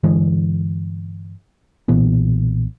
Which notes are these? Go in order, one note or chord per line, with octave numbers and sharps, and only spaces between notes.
G2 D3 E3 G#3
B1 A#2 E3 B3